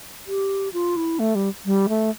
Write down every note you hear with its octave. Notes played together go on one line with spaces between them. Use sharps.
G4
F4
E4
A3
G3
G3
A3